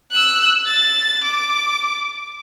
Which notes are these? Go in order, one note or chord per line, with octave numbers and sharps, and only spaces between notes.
E6 F#6
A6
D6